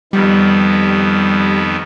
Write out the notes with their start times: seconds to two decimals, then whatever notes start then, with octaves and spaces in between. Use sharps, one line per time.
0.13 F2 D#3 G3 B3